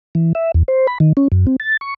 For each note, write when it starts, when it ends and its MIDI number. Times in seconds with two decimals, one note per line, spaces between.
0.15 0.33 52
0.35 0.52 76
0.54 0.63 40
0.68 0.87 72
0.87 0.98 83
1.00 1.13 51
1.17 1.28 61
1.32 1.46 42
1.47 1.56 60
1.60 1.77 93
1.81 1.94 85